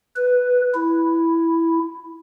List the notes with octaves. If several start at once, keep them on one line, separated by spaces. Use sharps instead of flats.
B4
E4